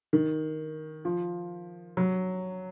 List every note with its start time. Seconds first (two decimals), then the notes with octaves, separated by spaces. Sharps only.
0.13 D#3
1.05 F3
1.97 F#3